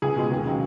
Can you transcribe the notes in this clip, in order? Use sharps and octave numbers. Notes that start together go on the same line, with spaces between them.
C#2 G#4
B2 G#3
D#2
C#3 F#3